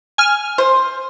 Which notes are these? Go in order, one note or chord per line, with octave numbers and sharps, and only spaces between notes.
G#5 F6
C5